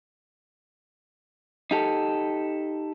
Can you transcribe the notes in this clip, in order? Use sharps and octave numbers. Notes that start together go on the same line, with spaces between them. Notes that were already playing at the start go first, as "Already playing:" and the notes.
D#4 G4 A4